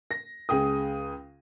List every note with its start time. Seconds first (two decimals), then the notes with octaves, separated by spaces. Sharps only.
0.11 A#6
0.49 C#2 G#4 G5 D#6